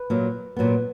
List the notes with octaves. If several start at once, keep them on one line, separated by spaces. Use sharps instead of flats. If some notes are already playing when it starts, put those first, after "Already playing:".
Already playing: B4
A#2 F#3 A#3
A#2 F#3 B3